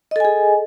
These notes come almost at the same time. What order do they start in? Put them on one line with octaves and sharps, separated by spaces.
D#5 A4 G#5 G#4